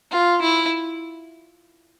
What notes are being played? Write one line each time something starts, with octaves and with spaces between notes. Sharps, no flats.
F4
E4